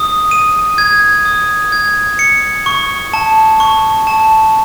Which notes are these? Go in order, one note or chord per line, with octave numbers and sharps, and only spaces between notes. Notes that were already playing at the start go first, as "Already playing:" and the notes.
Already playing: D#6
D#7
G#6
D#6
G#6
C#7
C#6
A5
C#6
A5